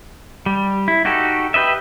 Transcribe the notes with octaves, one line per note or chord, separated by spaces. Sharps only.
G3
E4
D#4 F#4 G4 A4
G4 B4 D#5 E5